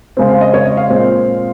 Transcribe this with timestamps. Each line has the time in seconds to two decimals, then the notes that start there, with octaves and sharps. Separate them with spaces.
0.17 C#3 G#3 C4
0.29 F5
0.41 D#5
0.54 C#5
0.66 D#5
0.77 F5
0.90 A#2 G#3 C4